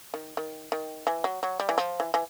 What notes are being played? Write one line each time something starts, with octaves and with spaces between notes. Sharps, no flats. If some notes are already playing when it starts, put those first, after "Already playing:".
D#3
D#3
D#3
E3
F#3
F#3
G3
E3
F3
E3
E3